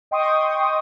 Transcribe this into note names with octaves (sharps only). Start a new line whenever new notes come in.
D#5 G5 C6 C#6 D#6